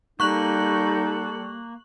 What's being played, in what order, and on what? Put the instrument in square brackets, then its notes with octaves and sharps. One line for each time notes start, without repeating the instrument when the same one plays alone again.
[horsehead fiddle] G3 A4 [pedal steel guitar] A#3 [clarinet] D#4 [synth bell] C#6 F#6 F#7